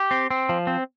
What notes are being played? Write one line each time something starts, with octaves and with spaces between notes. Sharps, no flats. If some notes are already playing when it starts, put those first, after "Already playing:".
Already playing: G4
C4
C4
F3
C4